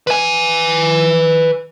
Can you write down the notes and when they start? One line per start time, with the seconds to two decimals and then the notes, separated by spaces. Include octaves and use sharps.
0.07 B4 G#5